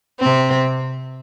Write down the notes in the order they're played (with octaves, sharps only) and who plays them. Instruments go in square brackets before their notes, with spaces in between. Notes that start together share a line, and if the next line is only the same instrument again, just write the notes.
[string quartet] C3 C4